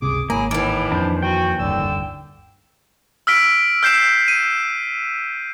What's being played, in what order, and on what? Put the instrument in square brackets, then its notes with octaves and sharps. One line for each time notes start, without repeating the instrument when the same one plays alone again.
[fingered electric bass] G1 C#2 C3 [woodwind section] G#4 D6
[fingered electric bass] G#1 [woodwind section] F#3 E4 [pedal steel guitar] A#3 [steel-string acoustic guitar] G#4
[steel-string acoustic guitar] D#2 E3 [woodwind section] A2 [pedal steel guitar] D6
[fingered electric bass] F2 [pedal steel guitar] D4 C5
[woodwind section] F#4 [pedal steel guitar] G5
[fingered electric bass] F1 D2 G2 [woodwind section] D3 D5 E6
[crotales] E6 F6 B6 D7
F6 G6 C7 E7
D#7